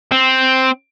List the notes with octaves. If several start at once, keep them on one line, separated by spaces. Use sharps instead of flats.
C4